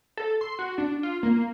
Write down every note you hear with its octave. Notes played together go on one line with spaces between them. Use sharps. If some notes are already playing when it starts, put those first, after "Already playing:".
A4
C6
F#4
D4
F4
A#3